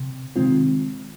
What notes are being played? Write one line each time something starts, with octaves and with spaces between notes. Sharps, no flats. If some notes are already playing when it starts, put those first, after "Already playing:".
Already playing: C3
C3 D#3 G#3 C4 F4